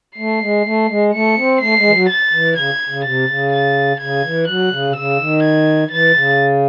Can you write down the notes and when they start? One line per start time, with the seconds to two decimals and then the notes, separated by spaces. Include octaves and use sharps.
0.17 A3 C7
0.41 G#3
0.65 A3
0.90 G#3
1.12 A3 C#7
1.37 C4
1.60 A3 C7
1.77 G#3
1.88 E3
1.93 F#3
2.09 A6
2.33 E3
2.56 C#3 G#6
2.89 C#3
3.04 C3 A6
3.28 C#3
3.52 A6
4.00 C#3 G#6
4.24 E3
4.48 F#3 F#6
4.71 C#3
4.89 C3
4.96 C#3 E6
5.20 D#3
5.43 G#6
5.91 E3 A6
6.15 C#3